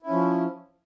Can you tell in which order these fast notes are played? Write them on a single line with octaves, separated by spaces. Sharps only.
E4 C#4 F3